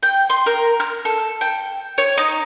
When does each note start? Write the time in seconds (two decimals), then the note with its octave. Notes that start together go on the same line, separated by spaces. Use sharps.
0.03 G5
0.30 C6
0.46 A#4
0.80 F6
1.05 A4
1.41 G5
1.98 C#5
2.17 D#4